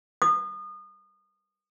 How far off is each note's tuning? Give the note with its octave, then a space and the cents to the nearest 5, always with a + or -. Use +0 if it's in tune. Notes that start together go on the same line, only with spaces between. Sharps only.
D#6 -30